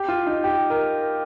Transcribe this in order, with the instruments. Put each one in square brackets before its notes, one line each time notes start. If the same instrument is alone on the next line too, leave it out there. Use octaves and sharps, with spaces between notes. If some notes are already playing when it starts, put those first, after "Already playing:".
Already playing: [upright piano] G4
F4
D#4
G4
A#4